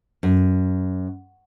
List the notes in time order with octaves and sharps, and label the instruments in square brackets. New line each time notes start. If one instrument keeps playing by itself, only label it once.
[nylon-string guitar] F#2